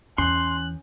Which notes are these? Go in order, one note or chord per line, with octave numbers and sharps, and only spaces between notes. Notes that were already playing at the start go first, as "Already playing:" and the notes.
E2 E3 C#4 C6 F#6